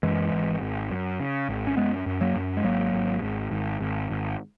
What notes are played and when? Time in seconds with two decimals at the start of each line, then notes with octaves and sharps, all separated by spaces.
0.03 F#2 E3 G#3
0.32 G#1
0.61 G#1
0.91 F#2
1.20 C#3
1.49 G#1
1.67 C#4
1.77 F#2 G#3 B3
2.06 F#2
2.21 F#3 A#3
2.36 F#2
2.57 G#3
2.64 G#1 F#3 A#3
2.94 G#1
3.22 G#1
3.51 G#1
3.80 G#1
4.10 G#1